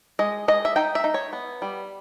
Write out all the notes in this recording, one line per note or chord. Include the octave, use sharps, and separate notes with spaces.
G#3 D#5
G#3 D#5
E5
D#4 G5
E5
D#4
C#5
B3
G3